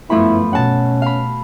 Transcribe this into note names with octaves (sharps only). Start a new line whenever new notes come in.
G1 F#2 F3 A3 B3 E4 B5
B2 C#4 F#5 A5
F5 B5